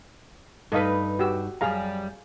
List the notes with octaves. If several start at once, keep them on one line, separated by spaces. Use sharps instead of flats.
G2 D#4 A4 B4 D#5 F5
F#4 G4 E6
F#2 G3 G#4 F5 A#5